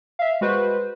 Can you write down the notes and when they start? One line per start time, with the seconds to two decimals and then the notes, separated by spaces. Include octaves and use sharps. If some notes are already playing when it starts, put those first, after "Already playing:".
0.19 E5 F5
0.41 G#3 F#4 B4 C5